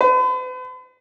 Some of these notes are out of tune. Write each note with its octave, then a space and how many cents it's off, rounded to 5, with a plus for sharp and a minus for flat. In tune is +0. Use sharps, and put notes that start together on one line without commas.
B4 +45